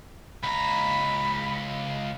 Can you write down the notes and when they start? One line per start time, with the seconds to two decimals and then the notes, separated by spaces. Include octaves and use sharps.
0.43 C#2 A#5 B5